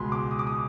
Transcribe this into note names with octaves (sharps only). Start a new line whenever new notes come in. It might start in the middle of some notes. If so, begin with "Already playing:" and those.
Already playing: C#2 B2 G#3 B5 C6
D6
D#6
D6
D#6